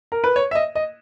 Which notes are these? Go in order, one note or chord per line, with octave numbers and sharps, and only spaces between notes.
A#4
B4
C#5
E5
D#5
D#5